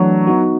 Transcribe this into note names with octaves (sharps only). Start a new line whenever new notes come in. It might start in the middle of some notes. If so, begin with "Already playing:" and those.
Already playing: E3 F#3 A3 D4
B3 D#4 F#4